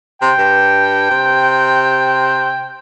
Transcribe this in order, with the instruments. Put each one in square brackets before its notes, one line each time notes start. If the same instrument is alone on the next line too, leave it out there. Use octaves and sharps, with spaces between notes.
[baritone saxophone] C3 [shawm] G5
[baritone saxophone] G2
C3